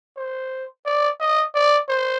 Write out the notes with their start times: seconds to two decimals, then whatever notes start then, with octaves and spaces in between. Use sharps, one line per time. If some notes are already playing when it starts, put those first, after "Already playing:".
0.17 C5
0.85 D5
1.20 D#5
1.54 D5
1.89 C5